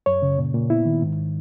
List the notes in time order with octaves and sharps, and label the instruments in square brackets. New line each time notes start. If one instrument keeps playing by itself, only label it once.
[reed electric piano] F#2 C#5
C#3
A#2
A#2
B3 E4
D#3
G#2